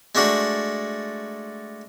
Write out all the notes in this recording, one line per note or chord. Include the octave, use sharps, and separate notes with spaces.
G#3 A3 D4 F#4